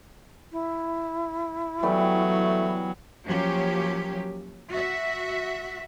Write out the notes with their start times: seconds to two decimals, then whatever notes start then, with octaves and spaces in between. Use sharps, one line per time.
0.52 E4
1.83 E3 F#3 G3 A3 B3
3.26 F3 F#3 A#3 C#4 G4
4.71 F#4 E5